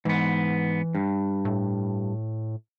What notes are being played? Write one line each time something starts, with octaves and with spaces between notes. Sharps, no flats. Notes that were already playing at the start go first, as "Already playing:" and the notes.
G#2 E3 B3
G2
A2